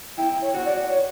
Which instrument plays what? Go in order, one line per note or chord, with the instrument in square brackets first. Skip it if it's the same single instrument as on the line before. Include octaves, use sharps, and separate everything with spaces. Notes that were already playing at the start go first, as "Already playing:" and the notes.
[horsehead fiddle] E4 [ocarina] G5
[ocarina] C#5
[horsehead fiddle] F#4
[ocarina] D5
C#5